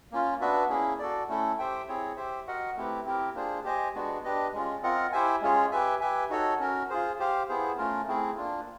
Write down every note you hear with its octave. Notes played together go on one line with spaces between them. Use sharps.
A#3 C#4 F4
B3 D4 F#4 B4 E5
A#3 C#4 E4 G#4
F#4 A4 D5
A3 C#4 E4 A4
G4 C5 E5 G5
C4 E4 G#4 C#5
G4 C5 E5
F#4 A#4 D#5 F#5
A3 C4 E4 G4 B4
C4 E4 G4 A#4
A#3 D4 F4 G#4 C5
G4 C5 D#5 G#5
G#3 B3 D4 F#4
D4 G4 B4 D#5
G#3 C#4 F4
C4 F4 A#4 D#5 F#5
E4 G4 C5 E5 G#5
G#3 C#4 F4 G#4 C#5
G4 B4 E5 G#5
G4 B4 E5 G#5
D#4 F#4 A4 C#5
C#4 F#4 A#4
F4 G#4 C5
G4 C5 F5
B3 E4 G#4 C5
A3 C#4 F4 A#4
A3 C4 E4 G#4
A#3 D4 F4